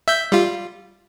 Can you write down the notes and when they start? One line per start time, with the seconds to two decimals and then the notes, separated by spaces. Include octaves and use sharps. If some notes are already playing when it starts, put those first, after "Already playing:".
0.08 E5 G6
0.32 G3 F4